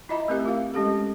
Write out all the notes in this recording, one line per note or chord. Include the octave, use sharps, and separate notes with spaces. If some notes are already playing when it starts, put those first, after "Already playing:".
E4 F4 D#5 E5 A#5 B5
A3 C4 G4 A#4 E5
F4 F5
G#3 C#4 G4 A4